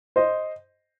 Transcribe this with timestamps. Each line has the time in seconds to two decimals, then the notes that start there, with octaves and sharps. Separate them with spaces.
0.16 C5 D#5